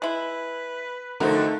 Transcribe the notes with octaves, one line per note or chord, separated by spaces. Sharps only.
G#3 E4 B4
F2 D3 A3 D#4 F#4 A#4 C5